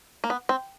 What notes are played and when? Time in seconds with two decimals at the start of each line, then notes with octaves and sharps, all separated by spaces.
0.24 A#3
0.30 B3
0.49 C4